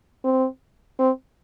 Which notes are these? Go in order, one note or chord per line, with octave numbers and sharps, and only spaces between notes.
C4
C4